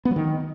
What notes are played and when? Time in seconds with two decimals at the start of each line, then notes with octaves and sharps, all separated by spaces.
0.05 B3
0.11 F#3
0.16 D#3